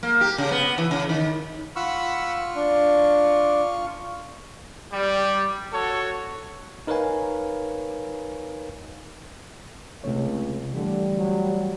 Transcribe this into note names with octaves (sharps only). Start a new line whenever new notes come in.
A#3
G4
C#3
B3
E3
C#3
D#3
F4 F#5 B5 C#6 E6 F6
D4
G3
F#4 A4 C#5
D#4 A#4 B4 C#5 F5 G#5
C#2 C3 A3 C#5
D3 E3 G3 A3
F#3